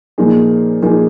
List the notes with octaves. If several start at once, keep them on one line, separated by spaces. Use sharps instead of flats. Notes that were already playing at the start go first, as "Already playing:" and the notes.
A#2 F3 A#3 D#4 G#4
A#2 F3 A#3 D#4 G#4